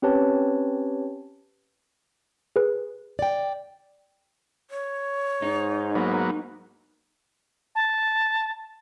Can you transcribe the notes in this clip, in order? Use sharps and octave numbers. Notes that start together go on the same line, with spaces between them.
C4 C#4 G4 B4 C#5 A5
G#4 B4
D5 G5
C#5
G#2 D#4
F#3 A#3 B3
A5